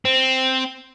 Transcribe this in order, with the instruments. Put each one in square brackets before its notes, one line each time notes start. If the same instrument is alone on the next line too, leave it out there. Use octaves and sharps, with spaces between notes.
[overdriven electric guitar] C4